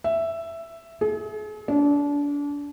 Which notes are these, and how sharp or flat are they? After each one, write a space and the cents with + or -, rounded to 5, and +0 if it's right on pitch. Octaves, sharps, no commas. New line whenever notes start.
E5 +5
G#4 +40
D4 -30